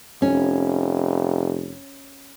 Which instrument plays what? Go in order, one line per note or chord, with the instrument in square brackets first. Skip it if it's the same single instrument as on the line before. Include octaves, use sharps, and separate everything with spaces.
[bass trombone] F1 [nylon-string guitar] C#4